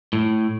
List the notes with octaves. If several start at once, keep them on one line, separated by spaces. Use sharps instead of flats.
A2